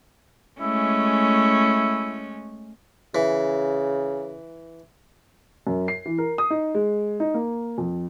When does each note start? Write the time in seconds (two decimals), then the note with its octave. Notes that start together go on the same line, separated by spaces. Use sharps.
0.60 G#3 A3 C#4 E4
3.15 C#3 E3
5.67 F#2
5.88 C7
6.06 E3
6.18 A#4
6.38 D#6
6.50 D#4
6.75 G#3
7.20 D#4
7.34 A#3
7.78 F2